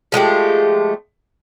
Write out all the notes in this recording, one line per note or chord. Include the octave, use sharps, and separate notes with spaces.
F3 G#3 A3 G4